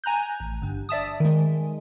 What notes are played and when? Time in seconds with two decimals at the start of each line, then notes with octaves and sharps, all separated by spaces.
0.04 G#5 A#5 F#6 G6
0.40 A1
0.62 G1 G2
0.89 D5 E5 A5 D#6
1.20 D#3 G#3